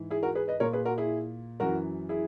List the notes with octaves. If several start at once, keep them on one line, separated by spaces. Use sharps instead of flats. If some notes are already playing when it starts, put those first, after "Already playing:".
Already playing: G#2 E3
E4 G#4
F#4 A#4
G#4 B4
B4 D#5
A#2 A#4 C#5
G#4 B4
F#4 A#4
E4 G#4
F#2 E3 F#4 A#4
E4 G#4